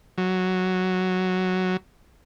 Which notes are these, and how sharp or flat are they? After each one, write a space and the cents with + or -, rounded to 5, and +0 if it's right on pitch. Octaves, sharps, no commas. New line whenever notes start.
F#3 +0